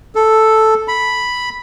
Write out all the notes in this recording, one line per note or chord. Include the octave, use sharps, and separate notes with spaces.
A4
B5